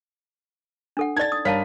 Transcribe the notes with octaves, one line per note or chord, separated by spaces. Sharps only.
D4 A4 F#5
D#4 D5 G#6 A6
D#6
G2 A#4 C#5 F5 A5 B6